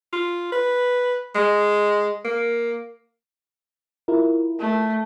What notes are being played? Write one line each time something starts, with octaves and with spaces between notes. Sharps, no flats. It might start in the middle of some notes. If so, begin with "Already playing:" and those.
F4
B4
G#3
A#3
E4 F4 A#4
A3